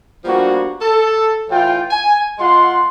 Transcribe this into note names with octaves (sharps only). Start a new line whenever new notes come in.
F3 G3 A#3 B3 D4 F#4
A4
A2 E3 F4 G5
G#5
G#3 F4 F#5 C6